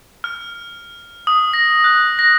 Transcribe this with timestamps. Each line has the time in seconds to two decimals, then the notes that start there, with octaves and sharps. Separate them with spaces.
0.24 F6
1.27 D#6
1.54 A#6
1.84 F#6
2.19 A#6